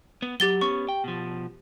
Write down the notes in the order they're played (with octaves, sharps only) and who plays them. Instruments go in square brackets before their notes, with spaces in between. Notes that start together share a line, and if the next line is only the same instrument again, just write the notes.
[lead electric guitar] B3
[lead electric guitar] F#3 [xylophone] G4 A6 G7
[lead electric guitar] B3 C#4 [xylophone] C#6
[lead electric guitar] G5
B2 F3